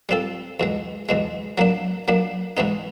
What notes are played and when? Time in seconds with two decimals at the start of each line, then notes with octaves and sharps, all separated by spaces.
0.09 G3 C4 F4 A4
0.60 E2 B2 G#3
1.09 E2 B2 G#3
1.58 F#3 A#3 D4
2.08 F#3 A#3 D4
2.57 G#2 E3 G#3 B3 D#4